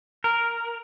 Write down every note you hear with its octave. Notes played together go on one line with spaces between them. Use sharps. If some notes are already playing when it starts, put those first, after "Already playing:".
A#4